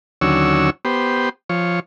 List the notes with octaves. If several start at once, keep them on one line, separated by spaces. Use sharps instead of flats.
D#2 D3 F#3 C#4 C#5 E6
B3 G4 C5
F3 C#5